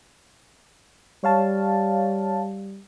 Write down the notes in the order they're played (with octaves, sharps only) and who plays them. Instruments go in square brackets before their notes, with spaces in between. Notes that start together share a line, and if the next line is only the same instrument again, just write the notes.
[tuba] G3 [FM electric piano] C#5 F5 A5